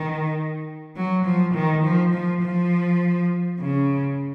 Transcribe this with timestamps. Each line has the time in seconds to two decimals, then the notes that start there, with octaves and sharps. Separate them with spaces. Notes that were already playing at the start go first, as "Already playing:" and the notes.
Already playing: D#3
0.96 F#3
1.25 F3
1.55 D#3
1.84 F3
2.13 F3
2.43 F3
3.60 C#3